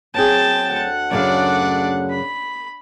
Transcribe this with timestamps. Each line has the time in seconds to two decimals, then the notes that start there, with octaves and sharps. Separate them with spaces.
0.14 F#3 C4 G#4 G5 A5
0.69 D2 A4 F#5
1.11 F#2 C#3 D4 D5 F5
2.10 B5